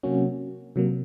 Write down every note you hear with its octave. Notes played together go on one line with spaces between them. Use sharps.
C3 F#3 A#3 C#4 F#4
C3 F#3 A#3